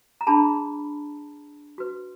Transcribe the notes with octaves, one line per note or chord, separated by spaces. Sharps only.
A#5
D4 F4 G#4 A5 B5
F#4 B4